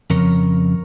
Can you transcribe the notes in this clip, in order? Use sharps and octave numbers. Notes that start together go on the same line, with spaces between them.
F2 C#3 A#4 C#5